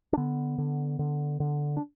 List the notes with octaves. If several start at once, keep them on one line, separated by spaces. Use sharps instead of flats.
D4
D3 B3
D3
D3
D3
D4